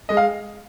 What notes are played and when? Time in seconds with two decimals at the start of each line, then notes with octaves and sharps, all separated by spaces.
0.09 G#3 D#5
0.17 F5